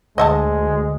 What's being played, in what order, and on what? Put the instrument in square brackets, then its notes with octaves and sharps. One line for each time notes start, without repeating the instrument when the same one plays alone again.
[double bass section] D2 [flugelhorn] G#3 [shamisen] D#5 E5 A5